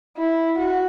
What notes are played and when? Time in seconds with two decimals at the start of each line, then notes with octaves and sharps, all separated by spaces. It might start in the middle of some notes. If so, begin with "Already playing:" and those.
0.17 E4
0.58 F#4